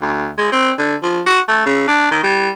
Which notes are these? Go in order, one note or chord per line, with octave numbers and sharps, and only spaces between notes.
D2
G#3
C4
D3
F3
F#4
A3
C#3
D4
D#3
G3